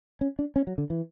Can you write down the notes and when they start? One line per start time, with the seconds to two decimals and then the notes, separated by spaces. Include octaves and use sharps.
0.21 C#4
0.39 D4
0.56 C#4
0.67 F#3
0.78 D3
0.90 E3